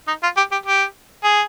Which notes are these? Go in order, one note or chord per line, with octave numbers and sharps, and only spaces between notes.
D#4
F4
G4
G4
G4
G#4